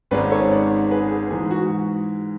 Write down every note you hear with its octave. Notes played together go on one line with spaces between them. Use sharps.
G#1 G#2 G#3 C#4 B4 D5
A4 C#5
B4 D5
G#4 B4
G#4
G#2 E3 G#3 G#4
F#4